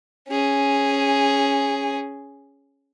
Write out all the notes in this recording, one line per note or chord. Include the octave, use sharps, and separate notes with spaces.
C#4 G#4